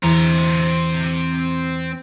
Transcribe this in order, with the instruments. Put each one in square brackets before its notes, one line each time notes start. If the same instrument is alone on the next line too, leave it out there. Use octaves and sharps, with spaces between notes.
[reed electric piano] E2 E3 [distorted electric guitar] C4 A#5